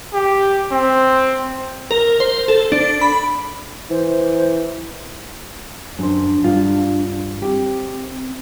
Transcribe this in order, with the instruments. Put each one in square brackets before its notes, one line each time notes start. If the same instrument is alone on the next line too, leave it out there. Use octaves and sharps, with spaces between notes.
[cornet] G4
C4
[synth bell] A#4
C5
A4
D4
B5
[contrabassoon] E3 [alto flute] C5
[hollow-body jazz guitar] F#2 C5 [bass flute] D4
[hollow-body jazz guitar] G2 F4
[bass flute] C4 [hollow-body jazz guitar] G4